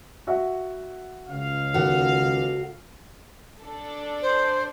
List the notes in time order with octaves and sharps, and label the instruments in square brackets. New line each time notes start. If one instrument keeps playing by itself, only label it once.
[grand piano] F#4 E5 F#5
[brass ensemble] C#2 F5
[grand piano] D#2 [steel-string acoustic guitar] F#4 A4
[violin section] D4 A4
[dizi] C5